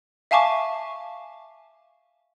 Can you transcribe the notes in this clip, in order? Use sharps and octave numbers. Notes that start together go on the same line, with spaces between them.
E5 F5 G#5 A5 C#6 D6